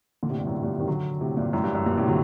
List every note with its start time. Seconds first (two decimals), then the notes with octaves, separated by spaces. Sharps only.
0.23 A#2 D3
0.30 A2 C3
0.39 G2
0.47 F#2 A2
0.63 G2 A#2
0.79 C3 D#3
0.88 D3 F#3
1.21 A2 C3
1.37 G2 A#2
1.53 F#2 A2
1.64 G2
1.75 F#2 A2
1.86 G2 A#2
1.97 A2 C3
2.08 D3 F#3